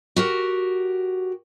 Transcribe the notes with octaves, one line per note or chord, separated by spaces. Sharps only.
F#4 G4 A#4